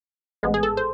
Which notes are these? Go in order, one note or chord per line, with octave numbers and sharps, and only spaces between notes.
A1 G#2 G#3 B3
G#4
A4
C5